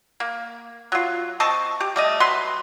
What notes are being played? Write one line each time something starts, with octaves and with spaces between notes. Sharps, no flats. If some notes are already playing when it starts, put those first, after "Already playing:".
A#3
F#3 F4
C4 D#5 A5 C#6
G4
G3 A3 D#5
F#3 B4 C6